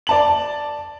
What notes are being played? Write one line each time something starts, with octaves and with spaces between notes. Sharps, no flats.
D5 A5 F#7